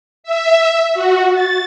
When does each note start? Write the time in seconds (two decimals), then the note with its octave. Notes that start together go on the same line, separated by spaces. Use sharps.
0.24 E5
0.94 F#4
1.33 A6